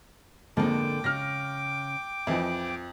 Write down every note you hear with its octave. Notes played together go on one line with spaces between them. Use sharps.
F2 G#2 D3 F3 A#3 G5 D6
C#3 F6 A#6
F2 E3 F3 C4 D#5 E5